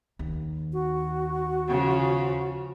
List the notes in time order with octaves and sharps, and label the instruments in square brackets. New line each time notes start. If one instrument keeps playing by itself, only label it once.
[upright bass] D#2
[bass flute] F#4
[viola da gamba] C#3 F3